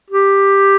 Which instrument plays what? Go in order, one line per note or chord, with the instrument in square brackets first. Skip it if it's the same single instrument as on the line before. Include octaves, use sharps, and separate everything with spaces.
[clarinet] G4